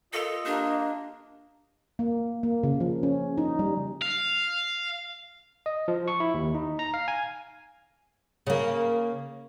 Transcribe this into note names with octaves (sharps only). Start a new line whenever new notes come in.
F4 A4 A#4 D#5 F5
A#3 D4 G4
A#3
A#3
C#3
F3
C#4
D#4
G3
F5
D#5
F3
C#6
E4
D#2
D#4
A#5
F5
G#5
C#3 A#3